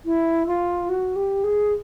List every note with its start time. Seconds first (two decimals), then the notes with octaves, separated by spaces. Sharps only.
0.05 E4
0.47 F4
0.89 F#4
1.15 G4
1.44 G#4